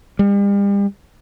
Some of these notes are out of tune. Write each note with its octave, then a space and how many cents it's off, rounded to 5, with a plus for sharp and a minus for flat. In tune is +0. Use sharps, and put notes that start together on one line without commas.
G3 +40